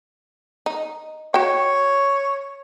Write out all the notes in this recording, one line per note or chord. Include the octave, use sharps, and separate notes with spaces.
D#4
F#4 C#5 G5